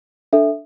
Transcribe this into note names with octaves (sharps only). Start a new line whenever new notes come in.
D4 A4 E5